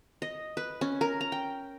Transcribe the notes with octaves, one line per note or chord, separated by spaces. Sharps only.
D#5
B4
C#4
A#4
A#5
G5